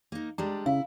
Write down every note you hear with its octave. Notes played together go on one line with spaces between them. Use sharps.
A#3 D#4
G3 G#3 D4 A#5
C#3 E4 F5